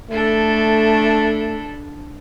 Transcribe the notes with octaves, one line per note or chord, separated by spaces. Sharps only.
A3 D4 E4 A4